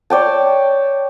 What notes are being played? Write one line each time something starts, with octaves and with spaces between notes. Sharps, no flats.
C#5 D5 G5 A5